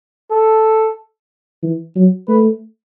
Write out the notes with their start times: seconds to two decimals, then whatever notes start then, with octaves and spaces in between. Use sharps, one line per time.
0.31 A4
1.63 E3
1.96 F#3
2.28 A3 B4